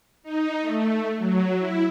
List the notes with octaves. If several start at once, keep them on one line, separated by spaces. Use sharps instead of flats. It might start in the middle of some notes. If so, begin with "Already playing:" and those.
D#4
A3
F#3
E4